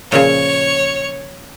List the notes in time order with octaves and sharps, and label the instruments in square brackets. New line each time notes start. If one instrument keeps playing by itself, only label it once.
[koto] A#2 C#3 F3 [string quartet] C#5